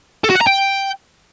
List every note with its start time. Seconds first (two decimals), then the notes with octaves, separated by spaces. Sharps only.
0.24 A4
0.30 F#4
0.35 F#5
0.41 A#5
0.47 G5